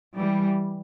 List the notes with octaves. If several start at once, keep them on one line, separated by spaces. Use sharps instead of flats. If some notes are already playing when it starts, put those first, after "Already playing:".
E3 G3